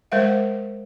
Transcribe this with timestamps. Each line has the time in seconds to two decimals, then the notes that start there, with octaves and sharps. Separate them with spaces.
0.12 G#3 A#4 C5 E5 F5